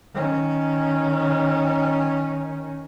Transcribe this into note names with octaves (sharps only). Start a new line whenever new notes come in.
D#3 C#4